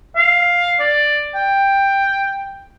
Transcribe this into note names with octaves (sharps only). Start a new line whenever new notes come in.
F5
D5
G5